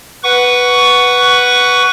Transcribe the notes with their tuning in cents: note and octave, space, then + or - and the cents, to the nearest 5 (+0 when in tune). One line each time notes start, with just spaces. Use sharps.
B4 +0 F#5 +0 C#6 +20